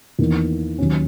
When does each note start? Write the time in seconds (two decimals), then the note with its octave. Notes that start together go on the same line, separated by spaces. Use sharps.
0.19 E2 D#3 A#3
0.78 D#2 D#3 F#3 C#4